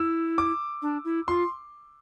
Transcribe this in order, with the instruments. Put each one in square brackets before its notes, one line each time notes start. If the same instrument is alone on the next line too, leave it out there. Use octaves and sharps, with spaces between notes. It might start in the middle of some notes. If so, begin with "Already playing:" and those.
Already playing: [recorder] E4 [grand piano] E6
[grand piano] D6
[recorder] D4
E4
[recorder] F4 [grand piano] C6